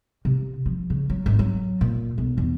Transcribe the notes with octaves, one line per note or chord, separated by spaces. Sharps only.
C3
F3
C#3
F#3
G#1
F#3
A#2
B1
E2